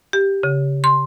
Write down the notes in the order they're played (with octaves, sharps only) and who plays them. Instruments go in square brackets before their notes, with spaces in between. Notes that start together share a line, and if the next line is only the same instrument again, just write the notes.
[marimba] G4
C#3
C6